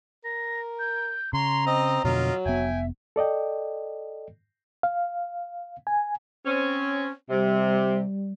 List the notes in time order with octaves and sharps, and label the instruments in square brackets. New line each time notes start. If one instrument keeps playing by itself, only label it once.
[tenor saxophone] A#4 [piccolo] A#6
[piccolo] G6
[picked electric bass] C#3 [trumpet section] C#5 C6 [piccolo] A#5
[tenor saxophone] C4 [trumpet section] D#5
[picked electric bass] F2 B2 D3 [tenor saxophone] F#3 [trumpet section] F4 A#4 D#5
[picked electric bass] F1 B3 [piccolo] E5 [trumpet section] G5 G#5
[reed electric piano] A4 D5 D#5 G5
F5
G#5
[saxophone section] C4 C#4
[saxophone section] C3 [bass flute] G3